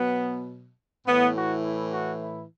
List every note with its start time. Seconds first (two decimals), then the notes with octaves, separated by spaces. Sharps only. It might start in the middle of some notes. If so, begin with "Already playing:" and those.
Already playing: B2 F#3 B3
1.07 A2 E3 B3
1.36 F#4
1.65 E4
1.93 F#4
2.22 E4